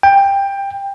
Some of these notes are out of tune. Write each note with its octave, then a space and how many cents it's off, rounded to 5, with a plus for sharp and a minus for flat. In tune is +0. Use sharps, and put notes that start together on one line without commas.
G5 +15